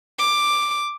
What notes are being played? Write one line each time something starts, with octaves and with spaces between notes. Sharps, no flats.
D6